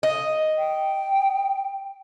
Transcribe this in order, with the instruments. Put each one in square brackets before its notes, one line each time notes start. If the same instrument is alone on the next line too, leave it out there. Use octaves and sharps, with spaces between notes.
[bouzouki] D#5
[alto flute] G5